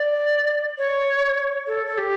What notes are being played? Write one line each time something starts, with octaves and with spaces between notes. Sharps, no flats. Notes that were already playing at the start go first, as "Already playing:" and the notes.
Already playing: D5
C#5
A4
A4
G4